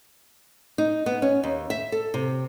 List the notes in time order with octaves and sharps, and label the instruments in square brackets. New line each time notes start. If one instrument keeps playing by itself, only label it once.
[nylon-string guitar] D#4
B3
C#4
D#2
E5
A4
C3